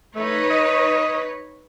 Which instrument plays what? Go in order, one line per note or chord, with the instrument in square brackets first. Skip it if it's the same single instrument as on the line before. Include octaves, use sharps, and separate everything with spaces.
[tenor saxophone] A3 [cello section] D#4 B4 C#5
[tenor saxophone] D#5